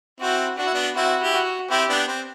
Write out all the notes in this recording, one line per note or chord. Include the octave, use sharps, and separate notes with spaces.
C4 E4 F#4
D4 F#4
E4
B3 D4
C4 E4 F#4
E4 G4
F#4
C4 E4 G4
B3 D4
C4